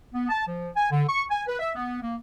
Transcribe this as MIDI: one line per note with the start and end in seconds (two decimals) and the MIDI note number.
0.14 0.26 59
0.29 0.44 81
0.47 0.70 53
0.76 0.88 80
0.91 1.02 50
1.08 1.23 85
1.30 1.42 80
1.48 1.59 71
1.60 1.71 76
1.75 1.98 59
2.01 2.15 58